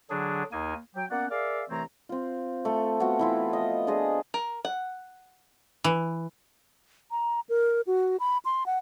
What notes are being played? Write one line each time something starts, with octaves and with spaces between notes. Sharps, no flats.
D3 F#3 D4 G#4
D#2 A#3 D#4 G#5
F#3 G5
A#3 B3 C#4 D5 F#5
G#4 A#4 D5 E5 F5
C2 E3 A3 C4 C#5 A#5
C4 F4
A3 A5
B3 F#4 F5 G5
E3 E4 F4
F3 D#5 F5
D4 F4 G#4 D#5
A#4
F#5
E3
A#5
A#4
F#4
B5
C6
F#5